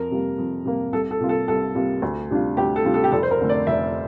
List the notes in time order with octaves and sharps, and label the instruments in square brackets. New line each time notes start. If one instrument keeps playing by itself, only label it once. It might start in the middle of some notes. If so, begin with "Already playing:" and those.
Already playing: [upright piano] F2 A#4
C3 G3 A#3
F2
C3 G3 A#3
C2 A4
A4
C3 G3 A#3 F4
A4
C2 A4
C3 G3 A#3 F4
D2
C3 G3 D4 F4
D2 G4
A4
C3 G3 D4 F4
A4
G4
F1 A4
C5
A#4
F2 D3 A3
D5
F1 E5